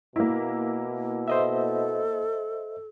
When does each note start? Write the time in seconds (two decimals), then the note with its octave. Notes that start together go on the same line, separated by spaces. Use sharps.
0.16 B2 A#3 E4
1.28 A4 C5 D#5 E5